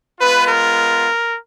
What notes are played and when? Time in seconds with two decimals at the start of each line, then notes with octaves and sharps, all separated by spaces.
0.20 G#3 B3 F4 B4
0.48 A#4